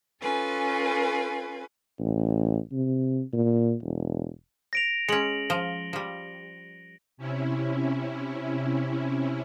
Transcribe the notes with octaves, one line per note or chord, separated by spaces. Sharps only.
C#4 F4 A4 B4 G#5
A1
C3
A#2
E1
A#6 D7 F7
G#3 C#4 C#7 F#7
F3 G7
F3 G3
C3 C#4 E4